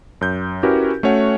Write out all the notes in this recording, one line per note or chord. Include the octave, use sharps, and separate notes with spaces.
F#2 G6
C#4 E4 F#4 G4 A#4 B4
A3 C#4 F#4 C#5 F#5